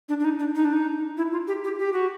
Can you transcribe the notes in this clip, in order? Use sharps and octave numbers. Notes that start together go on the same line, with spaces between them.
D4
D4
D#4
D4
D#4
D4
D#4
E4
F4
G4
G4
G4
F#4